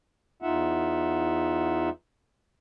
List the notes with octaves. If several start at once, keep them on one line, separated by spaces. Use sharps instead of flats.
E2 D#4 F4 E5 F#5